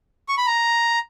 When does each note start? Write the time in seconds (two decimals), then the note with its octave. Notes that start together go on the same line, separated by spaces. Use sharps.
0.29 C#6
0.38 B5
0.47 A#5